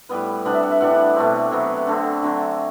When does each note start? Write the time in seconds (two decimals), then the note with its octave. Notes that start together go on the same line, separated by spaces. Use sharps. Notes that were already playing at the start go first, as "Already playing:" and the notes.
0.09 A2 G3 B3 B4
0.45 C3 G3 B3 D4 F#5
0.54 E5
0.63 F#5
0.71 E5
0.80 A2 E3 G3 D4 F#5
1.16 B2 A3 C4
1.51 C3 F#3 B3
1.87 D3 A3 C4
2.23 D3 F#3 C4